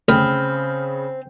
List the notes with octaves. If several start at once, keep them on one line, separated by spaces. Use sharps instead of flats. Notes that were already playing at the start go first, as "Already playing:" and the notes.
D2 C#3 C4 B5 D#6 F6